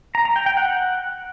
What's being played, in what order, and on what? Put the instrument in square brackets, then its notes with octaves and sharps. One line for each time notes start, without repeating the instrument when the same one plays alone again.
[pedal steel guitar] A#5
A#5
G5
G5
F#5